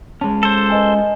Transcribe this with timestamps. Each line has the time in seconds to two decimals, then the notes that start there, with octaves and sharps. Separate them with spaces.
0.21 G#3 C#4 A5
0.43 A4 C5
0.70 B4 D#5 G#5